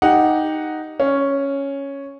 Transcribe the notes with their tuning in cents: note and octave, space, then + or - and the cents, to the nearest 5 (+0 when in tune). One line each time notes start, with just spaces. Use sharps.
D#4 +0 G4 +0 F#5 +0
C#4 +0 F5 +0